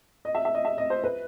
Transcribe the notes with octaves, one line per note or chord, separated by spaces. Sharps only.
D#5
E5
E5
D#5
E5
D#5
C5
B4